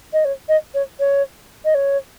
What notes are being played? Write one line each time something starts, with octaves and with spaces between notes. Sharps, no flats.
D#5
C#5
D#5
C#5
C#5
D#5
C#5